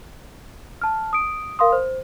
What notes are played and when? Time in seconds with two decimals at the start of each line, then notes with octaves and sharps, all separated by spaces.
0.81 A5 F6
1.13 D#6 D7
1.59 A#4 F5 C6 D#6
1.72 C5